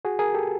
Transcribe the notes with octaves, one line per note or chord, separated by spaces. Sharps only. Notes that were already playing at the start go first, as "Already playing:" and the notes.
F#4 G#4
G#4 A#4
G4 A4